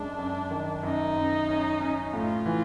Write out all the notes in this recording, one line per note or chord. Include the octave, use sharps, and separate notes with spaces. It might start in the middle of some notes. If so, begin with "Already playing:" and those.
Already playing: F#2 G#3 D4
F#2
D#3
F#2 D#4
F#2
C#4
C#4
A2 F4
E3